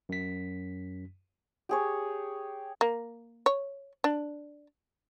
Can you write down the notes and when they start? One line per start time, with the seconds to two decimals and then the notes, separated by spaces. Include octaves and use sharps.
0.09 F#2 B6
1.69 G4 G#4 C#5
2.81 A#3
3.46 C#5
4.04 D4